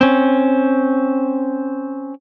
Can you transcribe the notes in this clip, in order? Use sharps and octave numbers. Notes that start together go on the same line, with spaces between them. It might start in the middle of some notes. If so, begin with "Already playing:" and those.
C4 C#4